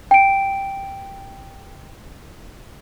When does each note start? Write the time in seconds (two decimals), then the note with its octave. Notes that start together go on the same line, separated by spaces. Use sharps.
0.11 G5 D7